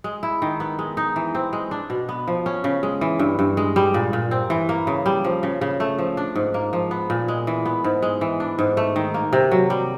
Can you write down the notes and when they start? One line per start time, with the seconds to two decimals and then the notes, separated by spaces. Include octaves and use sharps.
0.04 G#3
0.23 E4
0.42 D#3
0.60 B3
0.79 G#3
0.97 D#4
1.16 E3
1.35 C4
1.53 G#3
1.71 D4
1.90 B2
2.09 B3
2.28 F3
2.46 C#4
2.64 C#3
2.83 G#3
3.01 E3
3.19 G2
3.39 G2
3.57 G#3
3.76 G3
3.94 A#2
4.13 A#2
4.31 C4
4.50 E3
4.69 A#3
4.87 C#3
5.06 G3
5.24 F3
5.43 C#3
5.61 C#3
5.80 A3
5.98 F3
6.17 D4
6.35 G#2
6.54 A#3
6.73 F3
6.91 B3
7.10 A#2
7.28 G#3
7.47 E3
7.65 B3
7.84 G#2
8.02 G#3
8.21 E3
8.40 D4
8.59 G#2
8.77 A3
8.96 D#3
9.14 A#3
9.33 C3
9.51 F#3
9.70 G3